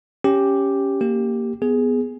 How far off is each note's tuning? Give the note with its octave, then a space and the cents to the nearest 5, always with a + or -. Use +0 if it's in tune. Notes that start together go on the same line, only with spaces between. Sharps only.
C#4 +0 G4 +0
A#3 -5 G4 +0
B3 +0 G#4 +0